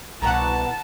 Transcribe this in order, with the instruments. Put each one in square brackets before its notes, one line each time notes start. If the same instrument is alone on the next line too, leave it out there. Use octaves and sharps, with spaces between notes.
[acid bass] C2 [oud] B2 E3 [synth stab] F#5 A#5 [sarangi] A5